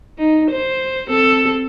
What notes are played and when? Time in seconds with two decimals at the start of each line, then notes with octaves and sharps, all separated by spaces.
0.18 D#4
0.51 C5
1.08 C4 A4